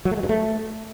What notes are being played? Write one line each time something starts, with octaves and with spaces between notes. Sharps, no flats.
F#3
A3
G#3
G2
A3